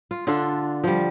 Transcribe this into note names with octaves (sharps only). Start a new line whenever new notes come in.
F4
D3 D4 F4 A4
F3 G3